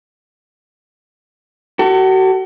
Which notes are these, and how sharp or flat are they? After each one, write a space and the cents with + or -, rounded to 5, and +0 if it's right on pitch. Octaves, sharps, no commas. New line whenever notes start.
F#4 +35 A4 +35